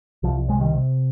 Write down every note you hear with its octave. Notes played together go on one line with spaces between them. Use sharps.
C2 F3
C3 G#3
D#3 G3
C3